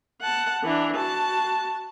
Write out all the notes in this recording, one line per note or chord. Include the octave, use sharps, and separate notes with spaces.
F#5 A5
E3 D4
F#4 A5